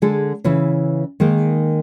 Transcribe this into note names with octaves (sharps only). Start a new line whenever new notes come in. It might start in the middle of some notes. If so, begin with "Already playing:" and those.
D3 G#3 G#4 A4
C#3 E3 E4 B4
D#3 G#3 A#3 D#4